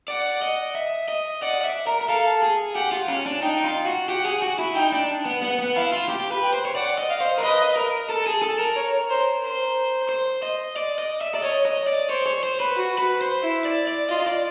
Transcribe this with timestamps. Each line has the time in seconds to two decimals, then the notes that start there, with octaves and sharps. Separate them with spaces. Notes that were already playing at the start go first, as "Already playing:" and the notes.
0.08 D5 F#5
0.42 D#5
0.75 E5
1.08 D#5
1.42 D5 F#5
1.64 E5
1.87 A#4
2.01 A#4
2.09 A4 F5
2.43 G#4
2.75 G4 F#5
2.92 F4
3.08 C#4
3.26 D4
3.42 D#4 G5
3.64 F4
3.86 F#4
4.09 G4 F#5
4.25 G#4
4.42 F#4
4.59 E4
4.75 D#4 G5
4.92 D4
5.25 B3
5.42 B3 F#5
5.59 B3
5.76 E4 F5
5.93 F4
6.09 G4
6.32 B4
6.42 G5
6.53 C5
6.65 C#5
6.75 D5 F#5
6.98 D#5
7.09 F5
7.20 C5
7.38 A#4
7.43 B4 D#5
7.76 A#4
8.09 A4
8.26 G#4
8.42 A4
8.59 A#4
8.76 C#5
9.10 C5
9.43 C5
10.09 C5
10.43 D#5
10.76 D5
10.98 D#5
11.21 E5
11.35 D5
11.42 C#5 D#5
11.65 D#5
11.87 D5
12.09 C5 C#5
12.26 C#5
12.43 C5
12.60 B4
12.77 F#4
12.98 B4
13.21 C5
13.43 E4
13.65 D5
13.88 D5
14.09 F4 D#5
14.27 D5